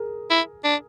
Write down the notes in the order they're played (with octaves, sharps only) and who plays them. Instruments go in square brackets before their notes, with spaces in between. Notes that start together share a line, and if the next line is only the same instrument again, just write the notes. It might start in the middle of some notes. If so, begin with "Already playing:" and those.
Already playing: [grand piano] G#4 A#4
[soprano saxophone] E4
D4